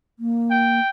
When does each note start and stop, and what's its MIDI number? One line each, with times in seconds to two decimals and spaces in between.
0.19 0.80 58
0.51 0.90 79